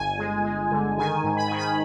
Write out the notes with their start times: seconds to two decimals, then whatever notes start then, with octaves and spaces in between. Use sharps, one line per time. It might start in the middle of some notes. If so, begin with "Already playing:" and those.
Already playing: G1 G#5
0.18 G#3
0.44 G#3
0.71 D3
0.98 D#3 G#5
1.24 G#2
1.37 B5
1.48 D#3 G#5
1.58 B5